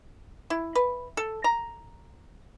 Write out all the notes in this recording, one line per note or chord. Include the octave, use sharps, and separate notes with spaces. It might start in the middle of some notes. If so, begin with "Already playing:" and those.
E4
B4
A4
A#5